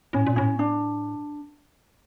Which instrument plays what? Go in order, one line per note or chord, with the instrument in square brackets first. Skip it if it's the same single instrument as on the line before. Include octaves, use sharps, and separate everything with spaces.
[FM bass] A2 [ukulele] C#4
[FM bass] A#2
[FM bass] A2 [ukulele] C#4
[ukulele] D4